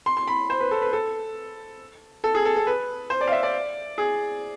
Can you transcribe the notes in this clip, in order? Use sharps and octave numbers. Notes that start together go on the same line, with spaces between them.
C6
C6
B5
C5
B4
A4
B4
A4
A4
G#4
A4
A4
B4
C5
D5
F5
E5
D5
G#4